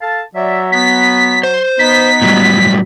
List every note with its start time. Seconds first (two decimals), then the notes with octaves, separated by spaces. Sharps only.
0.01 A4 F5 A5
0.35 F#3 D5 E5
0.72 B3 B6
1.43 C5
1.79 B3 D#4 B6
2.22 A2 F#3 G3